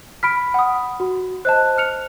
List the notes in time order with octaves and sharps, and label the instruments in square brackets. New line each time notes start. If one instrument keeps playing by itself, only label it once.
[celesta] B5 B6 [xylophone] F6 D7
[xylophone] F#5 D#6
[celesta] F#4
[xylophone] C5 D#5 A5 [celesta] F#6
[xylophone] F6 C#7 F7